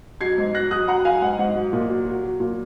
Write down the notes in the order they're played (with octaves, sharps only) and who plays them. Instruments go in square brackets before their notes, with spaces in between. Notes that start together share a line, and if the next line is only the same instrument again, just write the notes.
[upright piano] F#3 G#6 C7
G#2
F#3 F#6 A#6
F#3 D#6 F#6
F#3 F#5 A#5
F#3 F5 G#5
G#5
G#2 F#5
G#2 F#5
F#3
A#2
F#3
F#3
F#3
A#2